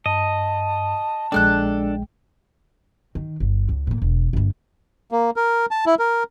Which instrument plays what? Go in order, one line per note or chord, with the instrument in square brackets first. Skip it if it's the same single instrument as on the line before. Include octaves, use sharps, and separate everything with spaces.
[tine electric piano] G2 [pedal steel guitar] D#5 [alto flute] A5
[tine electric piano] A#1 G#3 G5 [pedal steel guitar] D4 [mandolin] A4 F6 F#6
[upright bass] D#3
G1
C#2
A2 A#3
E1
G1 A#3
[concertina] A#3
A#4
A5
E4
A#4